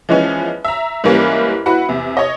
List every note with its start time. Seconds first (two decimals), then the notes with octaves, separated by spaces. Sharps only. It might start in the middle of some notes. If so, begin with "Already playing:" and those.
0.09 E3 F3 G#3 B3 C#4
0.65 E5 A#5
1.04 G#2 E3 G3 A#3 C#4 E4
1.66 E4 F#4 B4 F#5
1.89 E2 C3
2.17 C#5 D#5